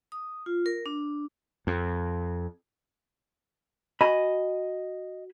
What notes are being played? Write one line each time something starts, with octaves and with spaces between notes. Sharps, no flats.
D#6
F4
A#4
D4
F2
F#4 D#5 G#5 B5